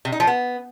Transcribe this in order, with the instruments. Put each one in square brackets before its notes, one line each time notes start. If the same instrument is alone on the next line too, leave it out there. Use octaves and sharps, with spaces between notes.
[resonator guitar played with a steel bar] C3
D#4
F3
B3